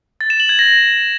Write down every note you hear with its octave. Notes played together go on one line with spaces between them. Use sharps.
A6
E7
F#7
G#6
A#6